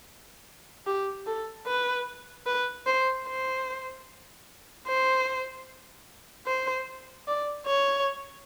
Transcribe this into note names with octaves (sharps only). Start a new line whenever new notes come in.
G4
A4
B4
B4
C5
C5
C5
C5
D5
C#5